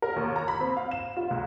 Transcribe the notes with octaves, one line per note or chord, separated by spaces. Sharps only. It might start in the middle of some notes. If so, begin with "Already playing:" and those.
A#4
D#2
A#5
B5
C4
F5
E7
F4
C#2